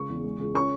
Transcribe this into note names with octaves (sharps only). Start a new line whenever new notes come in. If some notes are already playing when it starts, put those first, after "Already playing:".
Already playing: C#3 G#3 C#6
E2
G#3
C#2
C#4 C#6